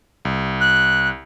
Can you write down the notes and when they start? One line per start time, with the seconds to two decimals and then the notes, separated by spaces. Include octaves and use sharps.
0.25 C2
0.61 F#6